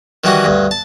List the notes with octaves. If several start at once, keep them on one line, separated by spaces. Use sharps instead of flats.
D#3 E3 G3 D#4 F#4
D2 G2
A5